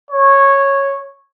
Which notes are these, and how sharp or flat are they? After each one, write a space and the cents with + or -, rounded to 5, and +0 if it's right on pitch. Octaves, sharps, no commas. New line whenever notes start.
C#5 -10